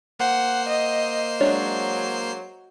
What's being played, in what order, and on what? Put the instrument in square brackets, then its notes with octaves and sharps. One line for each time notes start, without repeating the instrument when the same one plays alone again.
[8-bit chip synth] A#3 C5 C7 [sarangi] F#5
[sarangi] D#5
[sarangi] F#3 [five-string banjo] G#3 D4 C#5